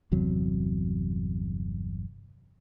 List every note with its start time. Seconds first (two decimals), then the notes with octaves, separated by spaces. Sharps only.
0.12 G1 E2 C3 F#3